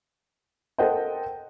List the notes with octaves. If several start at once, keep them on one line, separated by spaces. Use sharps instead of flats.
A4 A#4 C5 D#5 F#5 G5